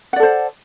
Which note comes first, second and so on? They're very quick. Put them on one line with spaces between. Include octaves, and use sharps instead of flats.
F#5 D5 A4 C5